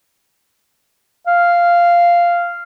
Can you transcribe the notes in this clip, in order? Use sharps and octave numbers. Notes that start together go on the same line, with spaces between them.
F5